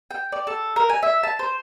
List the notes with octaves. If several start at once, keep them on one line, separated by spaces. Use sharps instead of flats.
G5
D5
A4
A#4
G#5
E5
A5
C5